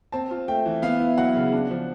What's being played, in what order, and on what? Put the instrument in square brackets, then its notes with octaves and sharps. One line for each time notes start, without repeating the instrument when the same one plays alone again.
[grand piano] C4 A5
F4
A3 G5
E3
B3 F5
E4
F#3 F#5
C#3
D4
F3